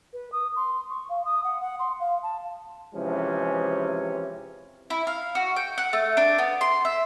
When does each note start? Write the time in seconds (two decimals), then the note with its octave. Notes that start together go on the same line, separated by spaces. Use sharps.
0.13 B4
0.32 D#6
0.56 C6
0.90 C#6
1.09 F5
1.25 D#6
1.44 F#5
1.61 F#5
1.79 C6
2.00 F5
2.23 A5
2.95 C3 E3 F3 G#3 C#4
4.90 E4
5.07 F5
5.35 F#4
5.56 G5
5.78 F#5
5.93 A3
6.17 D4
6.38 B3
6.61 C6
6.85 E5